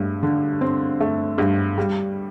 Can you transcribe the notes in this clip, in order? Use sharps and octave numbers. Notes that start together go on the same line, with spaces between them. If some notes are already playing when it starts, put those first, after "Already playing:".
Already playing: G2 A3
D3
C4
A3
G2
G3